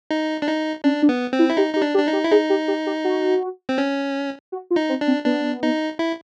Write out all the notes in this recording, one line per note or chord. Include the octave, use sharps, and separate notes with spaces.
D#4
D4
D#4
C#4 D4
D4
B3
C4
E4
E4
D#4 G4
D#4 G4
D4
G4
D4
D#4
G4
E4
D#4 G#4
G4
G4
G4
F#4
C4
C#4
F#4
F4
D#4
C4
D4
C4
B3 D4
D#4
E4